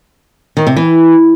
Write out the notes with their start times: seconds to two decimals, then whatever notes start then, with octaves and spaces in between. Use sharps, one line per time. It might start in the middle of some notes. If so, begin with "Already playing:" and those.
0.57 D#3
0.67 C3
0.76 E3